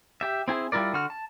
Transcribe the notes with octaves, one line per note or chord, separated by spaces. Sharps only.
G4 E5
C4 E4 G#4
G3 E4 F4 A#4 D5
D3 F#4 F6
A5